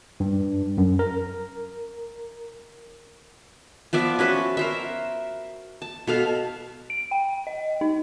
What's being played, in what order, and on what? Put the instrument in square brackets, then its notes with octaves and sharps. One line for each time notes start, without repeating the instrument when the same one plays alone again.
[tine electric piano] G2
F#2
A#4
[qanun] F3 B3 D5 E5
C#4 F#4 B4
A#4 C5 E5
A5
B2 A4 F5
[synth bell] D7
G5
D#5
D#4